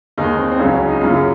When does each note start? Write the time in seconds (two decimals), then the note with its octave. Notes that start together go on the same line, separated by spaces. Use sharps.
0.18 D#2 D#3 G#3 D#4
0.38 C4
0.52 C4
0.59 C#2 C#3 F#3 C#4
0.74 C#4
0.88 D#4
1.01 F#1 F#2 C#3 F4